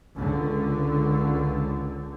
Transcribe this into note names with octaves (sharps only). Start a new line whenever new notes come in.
C#2 D3